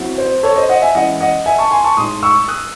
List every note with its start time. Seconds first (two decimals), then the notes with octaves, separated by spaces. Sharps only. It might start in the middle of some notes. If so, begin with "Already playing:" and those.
Already playing: F#3 C4 E4
0.18 C5
0.43 A4 C#5
0.56 C5 D#5
0.69 D#5 F#5
0.82 E5 G#5
0.94 E3 G#3 C#4 E4 D#5 F#5
1.21 D#5 F#5
1.46 E5 G#5
1.58 A5 C#6
1.71 G#5 C6
1.84 A5 C#6
1.97 A2 G#3 D#4 C6 D#6
2.23 C#6 E6
2.48 D#6 F#6